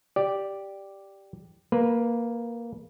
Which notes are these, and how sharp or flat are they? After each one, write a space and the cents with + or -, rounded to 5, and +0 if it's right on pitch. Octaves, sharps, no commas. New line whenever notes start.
G4 +0 D5 +0
A#3 +0 B4 -15